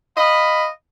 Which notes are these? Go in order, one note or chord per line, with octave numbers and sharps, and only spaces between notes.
D#5 F5 B5